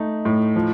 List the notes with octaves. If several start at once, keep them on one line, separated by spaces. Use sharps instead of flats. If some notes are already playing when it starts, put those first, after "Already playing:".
Already playing: A3 D#4
A2
F3